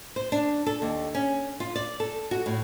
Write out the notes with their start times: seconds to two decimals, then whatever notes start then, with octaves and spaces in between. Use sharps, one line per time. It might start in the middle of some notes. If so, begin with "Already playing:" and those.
0.16 C5
0.32 D4
0.66 A4
0.82 D#2
1.15 C#4
1.60 F4
1.76 D5
2.00 A4
2.31 F#4
2.46 A2